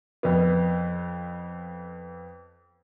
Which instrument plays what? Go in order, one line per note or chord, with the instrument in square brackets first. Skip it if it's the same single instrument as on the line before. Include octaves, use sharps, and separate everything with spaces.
[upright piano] F2 B3